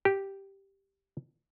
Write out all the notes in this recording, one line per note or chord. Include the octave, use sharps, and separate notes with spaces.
G4